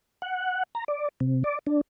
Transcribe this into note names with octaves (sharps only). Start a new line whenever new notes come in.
F#5
A#5
D5
C3
D5
D4